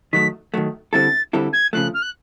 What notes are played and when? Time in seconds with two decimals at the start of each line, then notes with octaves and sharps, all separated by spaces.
0.12 D#3 F#3 A3 B6
0.54 D#3 F#3 A3
0.92 D3 G3 C4 E4 A4 A6
1.33 D3 G3 C4 E4 A4
1.53 G#6
1.73 C#3 F3 A3 F#6
1.94 F6
2.02 F#6